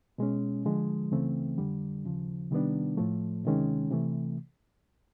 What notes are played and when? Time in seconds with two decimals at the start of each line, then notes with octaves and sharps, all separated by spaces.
0.18 B2 G#3 C#4
0.65 D3 F3 G#3
1.11 C#2 C#3 E3 A3 C4
1.58 F2 D3 G3
2.05 D#2 C#3 F3
2.51 C3 D#3 G3 B3 D4
2.97 A2 F3 A3
3.44 D2 C3 D#3 G#3 C#4
3.91 C3 E3 A3